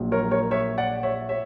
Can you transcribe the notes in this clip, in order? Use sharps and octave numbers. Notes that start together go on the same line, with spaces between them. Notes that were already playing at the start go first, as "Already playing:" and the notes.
Already playing: A#1 A#2 F#3
A#4 C#5
A#4 C#5
C#5 E5
D5 F#5
C#5 E5
C#5 E5